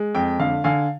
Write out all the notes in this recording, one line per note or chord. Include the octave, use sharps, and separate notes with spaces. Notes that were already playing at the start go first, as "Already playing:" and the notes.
Already playing: G#3
F2 G5
D3 F5
D3 F5 G#5